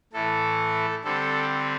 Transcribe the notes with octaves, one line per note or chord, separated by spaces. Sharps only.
A2 E3 A3 A4
D3 G3 C4 A4